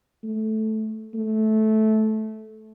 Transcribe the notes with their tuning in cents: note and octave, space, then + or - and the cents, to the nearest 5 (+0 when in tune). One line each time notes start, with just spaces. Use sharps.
A3 -10
A3 -15